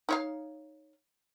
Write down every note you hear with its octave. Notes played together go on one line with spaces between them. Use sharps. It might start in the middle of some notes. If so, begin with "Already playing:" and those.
D#4 C#5 F5